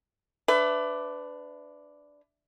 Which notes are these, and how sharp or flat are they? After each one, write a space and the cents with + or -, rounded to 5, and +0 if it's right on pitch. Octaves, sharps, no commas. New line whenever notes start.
D4 +0 B4 +25 E5 +0